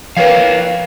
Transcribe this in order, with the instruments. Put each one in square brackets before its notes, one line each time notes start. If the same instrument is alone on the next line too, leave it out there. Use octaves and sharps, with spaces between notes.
[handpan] F3 B4 [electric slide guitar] A#4 C#5 F5